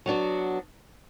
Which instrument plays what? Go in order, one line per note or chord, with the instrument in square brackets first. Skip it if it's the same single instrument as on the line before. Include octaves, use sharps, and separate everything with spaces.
[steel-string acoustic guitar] F#3 B3 D4 F#4